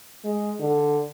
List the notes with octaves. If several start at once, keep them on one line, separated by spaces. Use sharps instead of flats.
G#3
D3